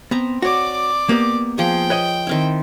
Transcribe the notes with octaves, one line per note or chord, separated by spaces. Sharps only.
B3 C4 A#5
F#4 C#5 D5 D6
A#3 B3 G4
F3 G#4 G5
B4 C#5 D#5
D#3 C4 E4